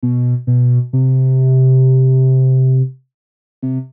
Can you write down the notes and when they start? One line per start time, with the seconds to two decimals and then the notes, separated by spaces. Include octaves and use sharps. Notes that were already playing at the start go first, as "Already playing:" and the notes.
0.03 B2
0.47 B2
0.93 C3
3.63 C3